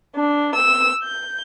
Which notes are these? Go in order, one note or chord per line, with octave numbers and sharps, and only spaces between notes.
D4
E6
G6